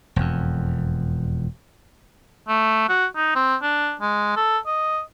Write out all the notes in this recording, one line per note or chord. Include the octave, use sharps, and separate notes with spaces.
E1 F2
A3
F#4
D#4
C4
D4
G#3
A4
D#5